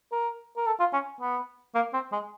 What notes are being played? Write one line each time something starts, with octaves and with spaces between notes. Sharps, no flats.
A#4
A#4
A4
F4
C#4
B3
A#3
C4
G#3